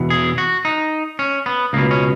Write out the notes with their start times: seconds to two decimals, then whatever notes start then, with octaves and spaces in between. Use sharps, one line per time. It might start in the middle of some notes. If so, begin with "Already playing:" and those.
Already playing: E2 B2
0.10 G#4
0.38 F#4
0.65 D#4
1.19 C#4
1.46 B3
1.73 C#2 B2 A#3
1.91 C#4